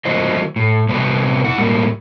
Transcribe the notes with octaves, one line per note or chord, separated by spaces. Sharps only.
D#3 F#3 A3 E4 C5 D#5
A2
C3 G3 B3 B4
E4 F#5
A2 G3 A#3